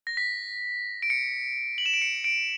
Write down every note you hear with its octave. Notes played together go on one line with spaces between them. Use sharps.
A#6
B6
D7
C#7
F#7
E7
D7
C#7
D7